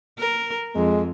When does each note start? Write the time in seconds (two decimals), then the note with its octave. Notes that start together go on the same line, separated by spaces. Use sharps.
0.19 A#4
0.75 F2 G#3